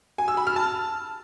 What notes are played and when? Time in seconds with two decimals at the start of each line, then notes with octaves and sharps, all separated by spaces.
0.18 G#5
0.28 E6
0.37 B5
0.47 F6
0.56 A5